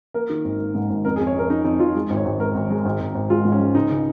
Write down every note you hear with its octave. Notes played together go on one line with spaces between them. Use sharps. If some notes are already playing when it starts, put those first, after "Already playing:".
A#3 A#4
D#3
G#1
A#3
G#2
G#1
F2 A#4
G#4
F2
C#5
F2 A#4
F2 D#4
F2 D#4
F2 F4
G#3
G#1
C#5
G#1
G#1 A#4
G#1
G#3
G#1
G#1
G#1
G#3 F4
G#2
C#4
G#3
C#2 D#4
C#3